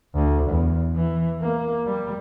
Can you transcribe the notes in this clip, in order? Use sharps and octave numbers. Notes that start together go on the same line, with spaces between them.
D2
E2
E3
A#3
G3